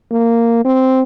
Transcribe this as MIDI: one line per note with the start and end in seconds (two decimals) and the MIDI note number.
0.11 0.64 58
0.65 1.02 60